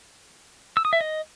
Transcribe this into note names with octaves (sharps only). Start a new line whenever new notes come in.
E6
D#6
E5
D#5